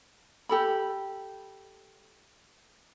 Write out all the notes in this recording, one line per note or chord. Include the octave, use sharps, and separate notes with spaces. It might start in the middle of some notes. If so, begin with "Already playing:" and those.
G4 A4 B5